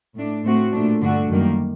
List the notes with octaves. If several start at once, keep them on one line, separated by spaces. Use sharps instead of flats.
A2 A3 D4
A2 A3 C4 F#4
A#2 A3 D4
G2 D3 A3 D4 F#4
F#2 D#3 G3 A#3